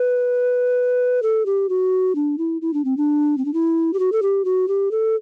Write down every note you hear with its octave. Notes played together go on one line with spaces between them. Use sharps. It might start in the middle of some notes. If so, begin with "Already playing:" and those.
Already playing: B4
A4
G4
F#4
D4
E4
E4
D4
C4
D4
C4
D4
E4
G4
F#4
A4
G4
F#4
G4
A4